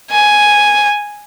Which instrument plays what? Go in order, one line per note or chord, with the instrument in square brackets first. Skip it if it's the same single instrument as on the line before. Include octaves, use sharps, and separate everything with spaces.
[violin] G#5